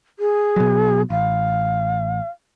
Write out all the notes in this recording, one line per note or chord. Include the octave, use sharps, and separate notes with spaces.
G#4
B2 F#3
A1 F5